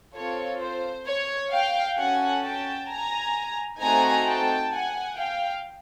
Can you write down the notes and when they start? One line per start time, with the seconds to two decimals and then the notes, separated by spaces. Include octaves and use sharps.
0.15 C4 F4 A4 C#5
0.61 C5
1.07 C#5
1.52 F5 G5
1.98 C#4 F#4 A4 F#5 G#5
2.43 G5 A5
2.89 G#5 A#5
3.80 A3 C4 D#4 F#4 A4 G#5 A#5
4.26 G5 A5
4.72 F#5 G#5
5.17 F5 G5